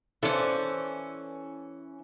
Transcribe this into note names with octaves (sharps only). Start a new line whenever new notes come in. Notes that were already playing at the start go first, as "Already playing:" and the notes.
E3 C#4 A4 C5 D5